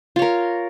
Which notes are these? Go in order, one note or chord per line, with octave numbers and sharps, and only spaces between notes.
F4 A#4 C#5